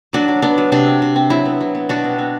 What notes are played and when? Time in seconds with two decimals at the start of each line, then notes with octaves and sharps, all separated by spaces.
0.13 F#3 D4 F#4
0.28 F#3
0.42 B3 D4
0.58 F#3
0.72 C3 D4
0.86 C4
1.02 C3
1.16 C4
1.30 F#3 E4
1.45 B3
1.61 F#3
1.75 B3
1.89 B2 D4 F#4
2.04 C4
2.19 C4